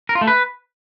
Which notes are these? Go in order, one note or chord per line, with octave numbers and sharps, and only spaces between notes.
A#4
F4
A3
B4